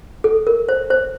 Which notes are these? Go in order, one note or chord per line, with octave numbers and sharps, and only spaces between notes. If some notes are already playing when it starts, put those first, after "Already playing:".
A4
A#4
C5
C5